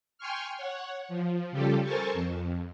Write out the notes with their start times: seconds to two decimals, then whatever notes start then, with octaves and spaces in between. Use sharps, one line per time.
0.18 G5 G#5 C6 C#6 F6
0.58 C#5 F#5
1.09 F3
1.51 C#3 G3 F4 G4 A4
1.83 A4 A#4 C5 G#5 A5 C#6
2.14 F2